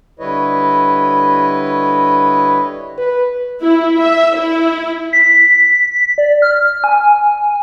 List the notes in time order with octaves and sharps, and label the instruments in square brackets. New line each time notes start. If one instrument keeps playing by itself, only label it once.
[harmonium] D3 G3 E4 B4 C#5 D#5
[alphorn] B4
[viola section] E4
E5
E4
[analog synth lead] B6
D5
F6
G#5